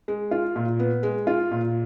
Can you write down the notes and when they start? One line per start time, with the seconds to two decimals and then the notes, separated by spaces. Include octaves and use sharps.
0.08 G#3
0.31 F4
0.56 A#2
0.79 B3
1.03 G#3
1.27 F4
1.51 A#2